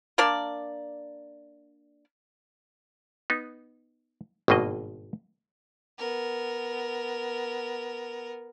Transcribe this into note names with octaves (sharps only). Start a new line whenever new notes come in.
A#3 D4 A#4 D5
B3 D#4
G#1 G2 B2 A#3 D#5
B3 A#4